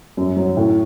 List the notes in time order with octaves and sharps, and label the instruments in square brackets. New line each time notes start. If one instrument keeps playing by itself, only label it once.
[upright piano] F#2
F#3
A2